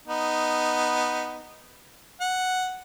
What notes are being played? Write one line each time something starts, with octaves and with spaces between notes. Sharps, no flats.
B3 D#4
F#5